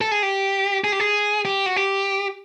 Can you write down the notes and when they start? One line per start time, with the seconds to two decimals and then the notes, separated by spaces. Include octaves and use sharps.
0.01 A4
0.11 G#4
0.23 G4
0.84 G#4
0.92 G4
1.00 G#4
1.45 G4
1.66 F#4
1.76 G4